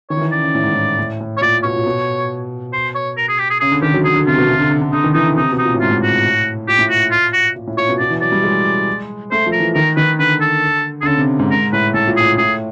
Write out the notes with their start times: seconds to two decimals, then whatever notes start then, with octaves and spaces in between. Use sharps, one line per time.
0.10 D#3 C#5
0.17 E3
0.21 D#3
0.32 C#3 D5
0.42 C#3
0.55 A2
0.64 G#2
0.74 A2
0.98 A2
1.20 A2
1.37 C#5
1.41 A#2 D5
1.64 B2 C#5
1.76 A#2
1.86 B2
2.73 C5
2.95 C#5
3.17 A#4
3.29 G#4
3.39 G4
3.50 G#4
3.61 C#3 G#4
3.72 D3
3.82 D#3 G4
3.94 F#3
4.04 F#3 G#4
4.16 D3
4.27 C3 F4
4.38 B2
4.48 C3
4.59 D3
4.71 D3
4.81 D3
4.93 D3 D#4
5.04 D#3
5.14 E3 D#4
5.26 D3
5.36 C3 D#4
5.52 B2
5.59 D#4
5.65 A#2
5.74 A2
5.81 G#2 F4
5.91 A2
6.03 F#4
6.68 A#2 G4
6.79 A2
6.89 A#2 F#4
7.11 F4
7.33 F#4
7.56 A#2
7.67 A2
7.77 A#2 C#5
7.89 B2
7.99 B2 D5
8.10 E3
8.21 F#3 D5
8.32 G3
8.44 G#3
9.31 A3 C5
9.46 F3
9.53 A#4
9.60 E3
9.75 D#3 A#4
9.97 D#3 B4
10.19 D3 B4
10.41 A4
11.02 D3 G#4
11.07 C#3 A4
11.18 C3
11.39 G#2
11.51 G#2 A#4
11.73 A2 B4
11.94 A2 A4
12.07 A#2
12.17 A2 G#4
12.38 A2 G#4